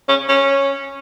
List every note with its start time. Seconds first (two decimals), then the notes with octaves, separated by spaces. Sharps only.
0.09 C#4
0.29 C#4